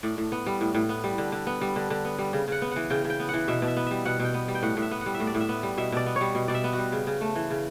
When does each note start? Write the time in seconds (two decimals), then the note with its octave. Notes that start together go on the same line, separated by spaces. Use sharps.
0.03 A2 D5
0.18 A2
0.32 B3
0.46 G3
0.61 A2
0.75 A2
0.89 B3
1.04 G3
1.18 D3
1.32 D3
1.47 B3
1.61 G3
1.76 D3
1.90 D3
2.05 B3
2.19 G3
2.33 C#3
2.48 C#3 F#5
2.62 B3
2.71 E3 F#5
2.90 C#3 G5
3.05 C#3
3.10 G5
3.20 B3
3.29 E3 F#5
3.48 B2 E5
3.62 B2
3.67 E5
3.77 B3
3.86 G3 E5
4.05 B2 F#5
4.20 B2
4.25 G5
4.34 B3
4.48 G3
4.55 G5
4.63 A2 F#5
4.77 A2
4.82 E5
4.91 B3
5.01 F#5
5.06 G3
5.14 E5
5.20 A2
5.27 D5
5.35 A2
5.40 E5
5.49 B3
5.63 G3
5.78 B2 E5
5.92 B2 D5
6.06 B3
6.16 C#5
6.21 G3
6.35 B2
6.48 B2 D5
6.54 E5
6.64 B3
6.73 F#4
6.78 G3
6.92 C#3
7.07 C#3
7.21 A3
7.35 E3
7.50 C#3